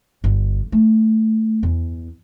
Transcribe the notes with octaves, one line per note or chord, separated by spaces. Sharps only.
G1
A3
E2